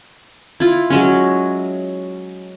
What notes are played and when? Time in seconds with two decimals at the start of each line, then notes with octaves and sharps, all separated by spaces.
0.60 E4 F4
0.90 F#3 G#3 C#4